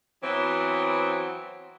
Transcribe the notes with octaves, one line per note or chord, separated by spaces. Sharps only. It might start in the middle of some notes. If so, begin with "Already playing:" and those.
E3 F#3 B3 C4